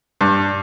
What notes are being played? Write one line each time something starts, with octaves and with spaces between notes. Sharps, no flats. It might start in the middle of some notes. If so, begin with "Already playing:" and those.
G2